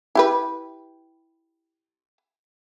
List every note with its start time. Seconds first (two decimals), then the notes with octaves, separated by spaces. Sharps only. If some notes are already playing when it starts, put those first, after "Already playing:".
0.15 E4 G4 B4